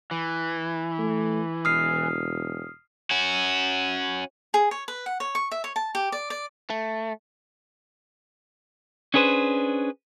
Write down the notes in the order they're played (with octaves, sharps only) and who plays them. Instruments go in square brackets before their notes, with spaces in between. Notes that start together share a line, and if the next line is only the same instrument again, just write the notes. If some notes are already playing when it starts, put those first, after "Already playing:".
[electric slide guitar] E3
[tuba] A3
[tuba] E1 [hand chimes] D#6 F6 C7
[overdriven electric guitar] C#4 F#4
[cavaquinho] G#4
C#5
B4
F#5
C#5
C#6
E5
C#5
A5
G4
D5
D5
[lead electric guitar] A3
[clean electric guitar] C#4 D4 G#4 B4 C5